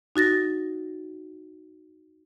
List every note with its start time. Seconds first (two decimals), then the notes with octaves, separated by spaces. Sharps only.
0.16 D#4 F#4 A6 A#6